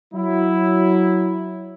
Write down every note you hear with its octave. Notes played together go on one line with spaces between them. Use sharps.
F#3 E4